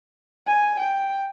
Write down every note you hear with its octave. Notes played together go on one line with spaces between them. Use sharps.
G#5
G5